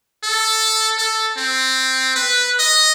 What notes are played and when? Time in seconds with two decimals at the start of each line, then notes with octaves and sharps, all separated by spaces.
0.24 A4
0.98 A4
1.37 C4
2.16 B4
2.59 D#5